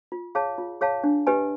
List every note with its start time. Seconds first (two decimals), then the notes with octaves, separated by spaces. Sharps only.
0.12 F4
0.35 G#4 C#5 F5 A5
0.58 F4
0.81 G#4 C#5 F5 A5
1.04 D4
1.27 G4 B4 D#5 G#5